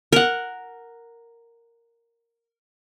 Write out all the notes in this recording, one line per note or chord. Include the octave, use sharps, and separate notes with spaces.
A#4 F#5